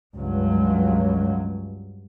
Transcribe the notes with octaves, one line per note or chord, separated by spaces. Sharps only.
C#2 G2 F#3